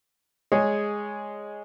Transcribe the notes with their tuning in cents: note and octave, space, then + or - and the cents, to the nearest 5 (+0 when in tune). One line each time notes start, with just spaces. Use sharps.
G#3 +0 G#4 -5 C#5 +0